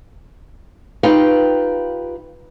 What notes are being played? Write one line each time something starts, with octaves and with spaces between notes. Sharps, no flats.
D#4 F4 G4 B4 F5 G5